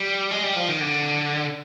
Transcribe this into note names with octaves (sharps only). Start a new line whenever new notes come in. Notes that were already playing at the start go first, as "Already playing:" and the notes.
Already playing: G3
G#3
G3
F3
D#3
D3